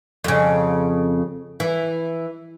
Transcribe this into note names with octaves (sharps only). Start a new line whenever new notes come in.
F2 C#3
E3